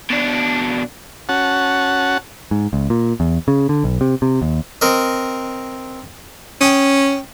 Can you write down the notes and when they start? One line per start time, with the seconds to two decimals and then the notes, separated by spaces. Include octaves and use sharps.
0.10 B2 D4
1.29 C#4 F#4 F#5 A5
2.51 G#2
2.73 C#2
2.90 A#2
3.20 E2
3.48 C#3
3.69 D3
3.84 B1
4.01 C3
4.22 C3
4.42 D#2
4.81 C4 A#4 D#5
6.61 C#4 G5 D#6